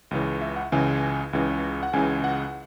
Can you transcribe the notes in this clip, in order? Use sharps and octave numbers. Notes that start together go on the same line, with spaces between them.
C#2 C#3 E3
E5
F#5
C#2 C#3 E3 G#5
C#2 C#3 E3
F#5
C#2 C#3 E3 G#5
F#5